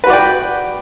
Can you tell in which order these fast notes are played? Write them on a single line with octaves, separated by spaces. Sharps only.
B4 F#4 D5 G5